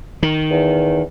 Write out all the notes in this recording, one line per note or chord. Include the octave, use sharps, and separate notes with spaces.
D#3
E2